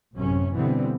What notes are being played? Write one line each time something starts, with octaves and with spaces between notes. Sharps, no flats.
A1 F#2 C3 C#4
B2 D3 E3 G3 B3 C4